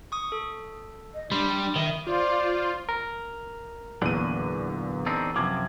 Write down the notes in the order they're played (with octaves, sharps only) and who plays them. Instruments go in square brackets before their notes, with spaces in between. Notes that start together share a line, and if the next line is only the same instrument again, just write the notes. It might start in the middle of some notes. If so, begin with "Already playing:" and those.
[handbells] C#6 D#6
A4
[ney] D#5
[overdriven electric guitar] G3 [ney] D4 [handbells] B5 C6
[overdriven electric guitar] D#3 [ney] E5
[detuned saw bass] F4 [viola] C5 D5
[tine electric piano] A#4
[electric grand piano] E2 D#7 [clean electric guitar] A#2 D3 F#3
[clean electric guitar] C4 D4 D#4
[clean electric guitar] F#2 C3 F3 [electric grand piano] D6 G#6